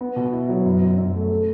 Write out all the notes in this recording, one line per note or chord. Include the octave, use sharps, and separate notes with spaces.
B3
B2
E4
F#3
F#2
F#2
F#2
A3
A4